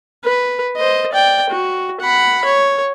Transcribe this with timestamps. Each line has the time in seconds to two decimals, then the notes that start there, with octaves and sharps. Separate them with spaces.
0.25 B4
0.77 C5 D#5
1.13 D5 G5
1.49 F#4
2.01 F#5 B5
2.45 C#5